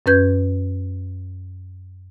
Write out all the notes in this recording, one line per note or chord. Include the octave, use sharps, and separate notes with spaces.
F#2 C#4 B4 G6 G#6